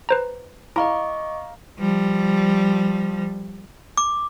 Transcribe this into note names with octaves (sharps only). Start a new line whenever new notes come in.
B4 C5 A#5
E4 D#5 F5 A#5 C#6 D6
F3 G3
D6